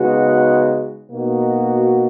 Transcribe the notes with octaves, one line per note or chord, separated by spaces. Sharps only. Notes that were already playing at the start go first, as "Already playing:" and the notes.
Already playing: C#3 G#3 B3 D#4 F#4
B2 A#3 D#4 F#4